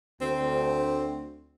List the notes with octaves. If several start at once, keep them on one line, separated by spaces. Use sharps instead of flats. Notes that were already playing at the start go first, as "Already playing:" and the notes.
D2 C4